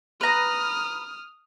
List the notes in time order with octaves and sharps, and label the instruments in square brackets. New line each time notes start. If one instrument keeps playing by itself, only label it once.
[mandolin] B4 A#5 [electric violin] D#6 F6